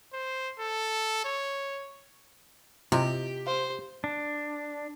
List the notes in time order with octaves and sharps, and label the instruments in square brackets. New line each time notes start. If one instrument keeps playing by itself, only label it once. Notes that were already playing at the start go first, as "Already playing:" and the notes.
[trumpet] C5
A4
C#5
[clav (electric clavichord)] C3 [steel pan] E4 F4 D#5 [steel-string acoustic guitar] G4
[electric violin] C5 [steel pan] F5
[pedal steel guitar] D4